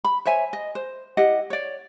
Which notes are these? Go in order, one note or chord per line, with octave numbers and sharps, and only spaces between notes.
B5
C5 C#5 E5 G#5
D#5
C5
E4 G4 D#5 F#5
C#5 D5